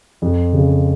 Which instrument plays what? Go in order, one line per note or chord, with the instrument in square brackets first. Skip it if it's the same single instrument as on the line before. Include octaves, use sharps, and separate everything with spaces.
[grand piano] F2
C#3